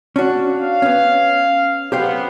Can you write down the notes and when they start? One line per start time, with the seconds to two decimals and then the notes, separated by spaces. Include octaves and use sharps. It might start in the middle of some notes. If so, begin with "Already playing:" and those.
0.16 C#4 D4 F#4
0.53 F5
0.82 B3 C#4
1.92 F#3 B3 G4 C5 F5